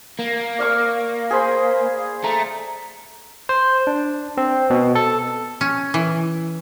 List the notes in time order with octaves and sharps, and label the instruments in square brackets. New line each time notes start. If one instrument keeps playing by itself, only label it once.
[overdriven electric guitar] A#3
[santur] D5 F5 C#6
G#4 C5 B5
[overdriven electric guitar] A3 [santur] A#5
[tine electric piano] C5
D4
C4
B2
A4
[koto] C#4
E3